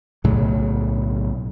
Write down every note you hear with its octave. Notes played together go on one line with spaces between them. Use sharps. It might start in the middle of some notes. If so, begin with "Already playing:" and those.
B1 A2 C#3 F#3